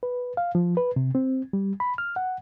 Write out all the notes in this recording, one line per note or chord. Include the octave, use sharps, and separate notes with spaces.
B4
F5
F3
B4
C3
C4
G3
B5
F6
F#5